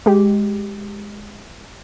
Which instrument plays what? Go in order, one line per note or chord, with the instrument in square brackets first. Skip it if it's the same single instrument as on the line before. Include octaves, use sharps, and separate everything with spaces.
[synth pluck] G#3 G4